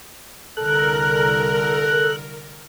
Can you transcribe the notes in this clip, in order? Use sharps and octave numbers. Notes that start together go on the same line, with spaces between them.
C2 D3 A4 A#4 F#6